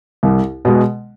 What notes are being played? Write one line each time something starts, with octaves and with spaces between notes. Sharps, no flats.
C2
B2 G#3